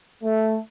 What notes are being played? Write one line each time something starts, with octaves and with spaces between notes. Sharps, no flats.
A3